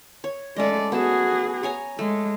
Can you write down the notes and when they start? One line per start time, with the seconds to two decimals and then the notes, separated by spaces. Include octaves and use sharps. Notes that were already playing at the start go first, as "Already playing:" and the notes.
0.24 C#5
0.56 G#3 A3 C#4 D5 D#5
0.92 B3 F#4 G#4 A5
1.63 C#5 G#5 A#5
1.99 G#3 A3